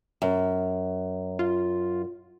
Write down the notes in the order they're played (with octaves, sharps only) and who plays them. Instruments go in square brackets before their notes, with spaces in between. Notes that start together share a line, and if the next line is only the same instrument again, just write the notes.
[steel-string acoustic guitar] F#2
[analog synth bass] F4